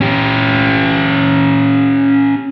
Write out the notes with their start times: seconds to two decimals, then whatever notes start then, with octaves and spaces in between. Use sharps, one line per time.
0.01 C#4 G4